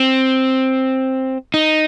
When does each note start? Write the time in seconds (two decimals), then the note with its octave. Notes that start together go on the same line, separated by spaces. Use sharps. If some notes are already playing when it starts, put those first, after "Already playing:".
Already playing: C4
1.54 D#4